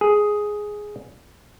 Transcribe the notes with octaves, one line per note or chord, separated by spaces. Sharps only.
G#4